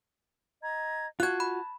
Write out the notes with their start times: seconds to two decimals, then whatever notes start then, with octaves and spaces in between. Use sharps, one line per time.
0.63 D#5 A#5 G#6
1.20 F4 F#4 A5 F#6 G#6
1.40 B5